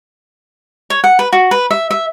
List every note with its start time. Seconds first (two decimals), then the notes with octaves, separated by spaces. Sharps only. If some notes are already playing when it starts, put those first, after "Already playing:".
0.90 C#5
1.04 F#5
1.19 B4
1.33 F#4
1.51 B4
1.71 E5
1.91 E5